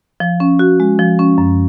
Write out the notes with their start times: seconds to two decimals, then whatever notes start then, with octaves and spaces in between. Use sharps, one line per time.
0.20 F3
0.40 C#4
0.59 F#4
0.80 G#3
0.99 F3
1.19 C#4
1.38 F#2